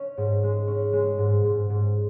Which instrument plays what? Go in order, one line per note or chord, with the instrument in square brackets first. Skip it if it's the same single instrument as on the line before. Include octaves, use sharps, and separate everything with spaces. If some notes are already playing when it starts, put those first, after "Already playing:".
Already playing: [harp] C#4
G#2
G#3
C#4
G#3
G#2
G#2
G#2